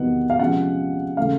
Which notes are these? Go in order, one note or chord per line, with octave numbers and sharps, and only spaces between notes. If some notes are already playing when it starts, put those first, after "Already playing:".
Already playing: E2 C3 D#3 F#3 B3 F#5
F5
C3 F3 G#3 C#4 F#5
C#3 E3 A3 C#4 F5